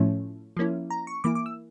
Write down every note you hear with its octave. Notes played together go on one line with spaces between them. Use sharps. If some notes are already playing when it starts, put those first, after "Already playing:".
Already playing: A2 F3 A3 C#4 E4
F3 A#3 C#4 E4
A#5
C#6
E3 A#3 E4 D6
D6
E6